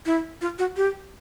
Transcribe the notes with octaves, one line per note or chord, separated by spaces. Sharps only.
E4
F4
F#4
G4